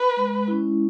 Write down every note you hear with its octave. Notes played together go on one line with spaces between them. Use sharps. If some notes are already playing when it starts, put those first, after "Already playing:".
Already playing: B4
G#3
C#4 E4